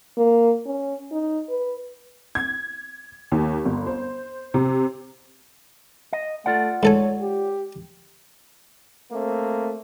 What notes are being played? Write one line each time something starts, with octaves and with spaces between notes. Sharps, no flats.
A#3
C#4
D#4
B4
G#6
D#2
G1
C5
C3
D#5
A3 F4 D5 F#5
G#2 A4 C#5 G#5
G4
A3 A#3 C4